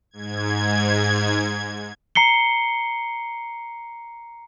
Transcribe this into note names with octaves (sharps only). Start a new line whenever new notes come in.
G#2 G#6
A#5 C7 C#7 G7